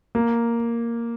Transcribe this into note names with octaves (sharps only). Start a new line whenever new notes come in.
A#3